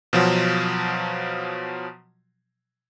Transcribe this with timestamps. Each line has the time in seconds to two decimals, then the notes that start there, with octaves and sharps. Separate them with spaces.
0.13 B2 F3 F#3